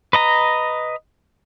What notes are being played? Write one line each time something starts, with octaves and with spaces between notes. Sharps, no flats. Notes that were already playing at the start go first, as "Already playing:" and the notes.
B4 D#5 A#5